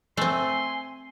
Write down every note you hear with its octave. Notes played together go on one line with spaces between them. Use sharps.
A3 C4 G#5 C6